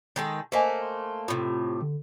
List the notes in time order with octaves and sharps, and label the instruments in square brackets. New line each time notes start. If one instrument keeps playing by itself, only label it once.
[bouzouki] D#3 G#3 A4
[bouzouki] A3 A#3 [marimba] C5 D#5 G#5 [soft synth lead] B6
[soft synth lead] C6
[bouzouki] A2 C3 [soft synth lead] F4
[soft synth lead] D3